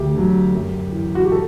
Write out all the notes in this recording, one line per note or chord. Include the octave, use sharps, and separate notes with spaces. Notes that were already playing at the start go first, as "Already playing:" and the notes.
Already playing: D2 G4
D3 F#3
F#2
E3
F#4
G4
A4